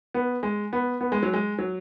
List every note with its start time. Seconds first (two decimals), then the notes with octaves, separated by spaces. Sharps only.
0.14 B3
0.43 G#3
0.73 B3
1.01 B3
1.12 G#3
1.23 F#3
1.33 G#3
1.58 F#3